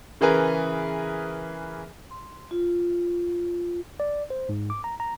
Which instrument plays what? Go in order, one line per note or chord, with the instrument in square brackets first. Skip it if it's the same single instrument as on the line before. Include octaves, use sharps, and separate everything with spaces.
[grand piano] C#3 E3 G#4 A#4 B4
[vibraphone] C6
F4
[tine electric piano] D5
C5
G#2
D6
A#5
A#5